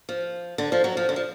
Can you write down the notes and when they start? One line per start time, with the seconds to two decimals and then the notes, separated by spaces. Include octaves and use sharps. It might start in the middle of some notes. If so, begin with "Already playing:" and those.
0.09 F3
0.58 D3
0.72 F3
0.84 F#3
0.97 F3
1.09 D3
1.16 F3